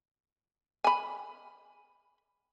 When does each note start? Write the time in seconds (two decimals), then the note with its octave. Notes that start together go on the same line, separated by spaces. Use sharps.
0.84 G#5 B5